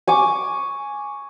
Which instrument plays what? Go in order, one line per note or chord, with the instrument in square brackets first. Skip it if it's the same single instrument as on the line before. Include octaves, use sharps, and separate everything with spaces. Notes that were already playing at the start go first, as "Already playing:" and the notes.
[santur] G#5 C#6 D6